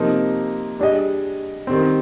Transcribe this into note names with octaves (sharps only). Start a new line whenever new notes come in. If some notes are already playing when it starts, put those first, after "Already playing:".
Already playing: C3 F3 A#3 D#4
G3 D4 G#4 D#5
D#3 G3 C4